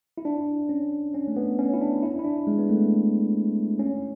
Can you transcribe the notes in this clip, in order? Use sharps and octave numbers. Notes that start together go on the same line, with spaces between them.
E4
D4
C#4
C#4
A3
B3
C#4
E4
D4
E4
E4
D4
G#3
B3
A3
C#4